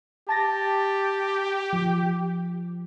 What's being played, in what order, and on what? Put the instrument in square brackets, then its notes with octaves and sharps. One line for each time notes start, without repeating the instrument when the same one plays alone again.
[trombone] G4 [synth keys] A5 A6 A#6
[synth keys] F3